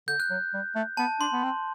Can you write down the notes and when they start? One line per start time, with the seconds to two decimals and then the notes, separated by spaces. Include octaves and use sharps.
0.08 D3 G6
0.20 F#6
0.30 F#3
0.54 G3
0.75 A3
0.97 B3 A5
1.20 D4 C6
1.33 B3
1.43 C4